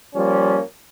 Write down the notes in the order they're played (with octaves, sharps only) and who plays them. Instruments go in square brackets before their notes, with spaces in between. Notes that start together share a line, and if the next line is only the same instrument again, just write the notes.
[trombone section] F3 G3 A#3 C#4